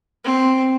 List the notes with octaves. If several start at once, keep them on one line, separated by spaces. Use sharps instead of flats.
C4